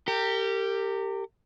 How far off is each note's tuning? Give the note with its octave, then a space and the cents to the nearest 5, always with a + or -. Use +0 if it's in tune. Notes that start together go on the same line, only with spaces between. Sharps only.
G4 +0 A#4 -35